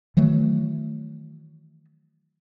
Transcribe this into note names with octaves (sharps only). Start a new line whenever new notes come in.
D#3 E3 F#3 A3